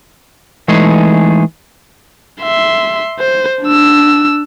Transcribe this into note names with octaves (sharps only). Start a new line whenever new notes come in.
E3 G#3 A3 D#4 G#4
E5 C6
C5
D4 E6